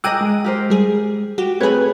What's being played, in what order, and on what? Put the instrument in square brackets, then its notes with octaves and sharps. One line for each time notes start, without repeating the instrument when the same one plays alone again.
[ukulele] G#4 A#4 D#5 [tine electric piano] G5 E6 [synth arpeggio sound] D6 F#6 D#7
[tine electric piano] G#3
[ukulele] G4 A#4 C5
[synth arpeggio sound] G3 G#4
[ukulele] F#4 [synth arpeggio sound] G4
[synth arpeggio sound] A3 G#4 [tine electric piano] C4 B4 [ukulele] C#5 B5